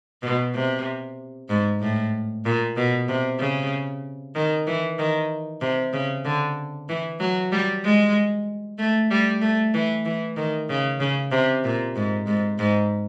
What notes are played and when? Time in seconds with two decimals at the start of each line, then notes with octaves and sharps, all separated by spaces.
0.22 B2
0.55 C3
1.50 G#2
1.81 A2
2.45 A#2
2.77 B2
3.09 C3
3.39 C#3
4.35 D#3
4.67 E3
4.99 D#3
5.62 C3
5.93 C#3
6.25 D3
6.89 E3
7.20 F#3
7.52 G3
7.84 G#3
8.79 A3
9.11 G3
9.41 A3
9.74 E3
10.06 E3
10.37 D#3
10.69 C#3
11.00 C#3
11.32 C3
11.64 A#2
11.96 G#2
12.27 G#2
12.59 G#2